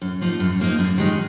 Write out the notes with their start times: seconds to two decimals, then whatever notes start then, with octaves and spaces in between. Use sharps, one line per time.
0.02 F#2
0.21 F3 A#3 D#4
0.40 F#2
0.60 F3 A#3 D#4
0.79 F#2
0.98 D#3 G#3 D#4